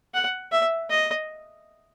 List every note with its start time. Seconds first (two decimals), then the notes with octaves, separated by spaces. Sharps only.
0.14 F#5
0.52 E5
0.90 D#5